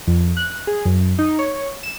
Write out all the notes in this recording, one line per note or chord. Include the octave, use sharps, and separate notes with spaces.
F2
F#6
G#4
F#2
D#4
C#5
E7